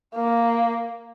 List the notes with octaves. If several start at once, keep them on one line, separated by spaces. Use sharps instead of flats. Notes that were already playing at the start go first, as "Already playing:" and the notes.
A#3